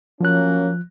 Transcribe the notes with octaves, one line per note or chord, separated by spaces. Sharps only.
F3 F#3 A#3 C#4 F#6